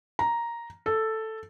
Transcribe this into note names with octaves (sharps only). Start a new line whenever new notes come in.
A#5
A4